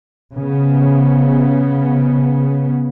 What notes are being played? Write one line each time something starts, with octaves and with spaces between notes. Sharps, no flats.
C#3 B3